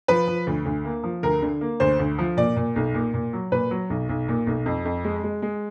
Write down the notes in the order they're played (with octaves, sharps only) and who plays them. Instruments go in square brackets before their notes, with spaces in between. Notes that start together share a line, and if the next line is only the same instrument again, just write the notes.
[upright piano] F3 B4
F3
D2
D2
A#3
F3
D2 A#4
D3
A#3
D2 C5
D2
F3
A#2 D5
A#2
B1
A#2
A#2
F#3
A#2 B4
F#3
B1
B1
A#2
B1
F2
F2
G#3
G#3
G#3